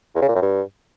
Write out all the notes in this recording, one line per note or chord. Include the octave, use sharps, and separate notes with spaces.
E2
C#3
A#2
F#2
G2